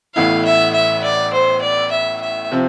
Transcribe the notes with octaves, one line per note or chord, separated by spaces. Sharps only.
A1 A2 E3 B3 E4 F5
E5
E5
D5
C5
D5
E5
E5
C3 F3 C4